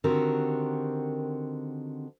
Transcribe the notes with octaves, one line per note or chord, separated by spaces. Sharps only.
D3 D#3 C4 F#4 G4 A#4